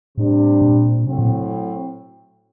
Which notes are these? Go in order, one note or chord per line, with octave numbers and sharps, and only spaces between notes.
A2 C3 G3 D4
A#2
A2 C3 F#3 C4
A#2